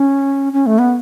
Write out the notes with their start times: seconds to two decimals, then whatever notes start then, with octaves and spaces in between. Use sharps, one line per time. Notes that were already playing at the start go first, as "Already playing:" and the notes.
Already playing: C#4
0.53 C#4
0.66 A3
0.79 B3